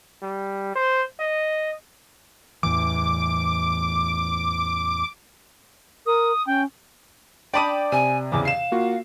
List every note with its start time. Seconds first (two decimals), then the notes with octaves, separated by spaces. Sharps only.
0.22 G3
0.75 C5
1.20 D#5
2.63 E2 A2 E3 D6
6.06 A#4 D#6
6.47 C#4 G5
7.54 D4 D5 G5 A5 B5 D6 D#6 D#7
7.92 C3 G#5 D#7
8.32 E2 C#3 D6
8.45 F5 C7 E7
8.72 A#3 F4 F#4